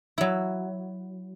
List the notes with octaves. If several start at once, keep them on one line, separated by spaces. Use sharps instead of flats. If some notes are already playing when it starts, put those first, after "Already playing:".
F#3 E4